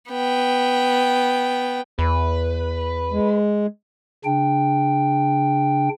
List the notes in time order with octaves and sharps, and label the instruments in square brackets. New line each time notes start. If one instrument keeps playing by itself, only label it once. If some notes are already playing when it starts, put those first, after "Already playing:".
[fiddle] B3 G5
[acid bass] E2 [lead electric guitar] B4
[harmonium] G#3
[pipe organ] C#3 D4 G5